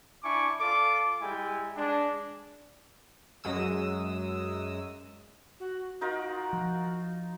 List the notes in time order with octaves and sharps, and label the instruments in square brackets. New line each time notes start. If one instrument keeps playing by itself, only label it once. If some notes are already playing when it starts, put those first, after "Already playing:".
[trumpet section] D4 E4 G#5 C#6 D6
F4 A4 D5 D6
G3 G#3 E4 G5 G#5
G#3 D4
[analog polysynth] F#2 F#3 G#3 D#6 E6
[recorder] F#4
[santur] D#4 F4 A#4 [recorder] F#4
[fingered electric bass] F3